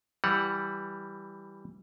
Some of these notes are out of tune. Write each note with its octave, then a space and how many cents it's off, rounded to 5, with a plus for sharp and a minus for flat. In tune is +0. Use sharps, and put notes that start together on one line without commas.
E3 +0 G3 +0 F#5 -5